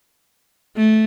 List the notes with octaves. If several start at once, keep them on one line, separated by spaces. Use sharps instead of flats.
A3